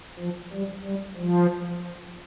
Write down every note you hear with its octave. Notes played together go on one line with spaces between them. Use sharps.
F3
G3
G3
F3